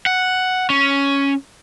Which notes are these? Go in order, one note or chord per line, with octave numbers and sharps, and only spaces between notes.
F#5
C#4